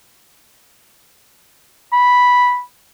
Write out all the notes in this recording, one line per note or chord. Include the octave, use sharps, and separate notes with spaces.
B5